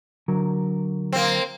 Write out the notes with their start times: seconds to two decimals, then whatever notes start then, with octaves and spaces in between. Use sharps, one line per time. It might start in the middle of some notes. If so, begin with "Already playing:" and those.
0.28 D3 F#3 A#4
1.13 A#3 C4